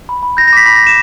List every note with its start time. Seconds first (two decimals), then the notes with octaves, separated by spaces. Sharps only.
0.09 B5
0.23 B5
0.37 G6 A#6
0.48 A#6
0.53 D6 B6
0.66 B5 B6
0.76 A#6
0.81 B5
0.87 E7